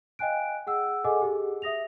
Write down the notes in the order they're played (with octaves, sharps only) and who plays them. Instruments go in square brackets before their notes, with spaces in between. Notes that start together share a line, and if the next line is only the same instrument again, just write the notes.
[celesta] D#5 F5 G5 G#5 F#6 D7
G#4 F#5 E6
G#4 A4 D#5 F#5 G#5 D6
G4 G#4
E5 D#6 A#6 F7